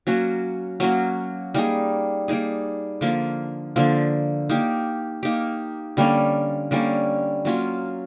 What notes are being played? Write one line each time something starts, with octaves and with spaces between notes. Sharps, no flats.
F#3 A#3 C#4 F#4
F#3 A#3 C#4 F#4
G3 A#3 D#4 G#4
G3 A#3 D#4 G#4
D3 F3 A#3
D3 F3 A#3
A#3 D#4 G4
A#3 D#4 G4
D3 G3 A#3 C#4
D3 G3 A#3 C#4
F#3 A#3 C#4 F4